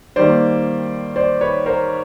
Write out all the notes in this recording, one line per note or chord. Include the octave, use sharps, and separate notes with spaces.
D#3 G3 A#3 C5 D5
C5 D5
B4 C#5
A#4 C5